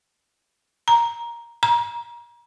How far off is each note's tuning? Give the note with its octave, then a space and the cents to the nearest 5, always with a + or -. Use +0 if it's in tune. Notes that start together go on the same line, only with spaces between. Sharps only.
A#5 +5
A#5 +35